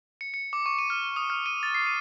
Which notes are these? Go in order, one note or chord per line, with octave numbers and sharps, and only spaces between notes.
C#7
C#7
D6
C#6
D#7
F6
D#6
F6
D#7
A6
C7
D#7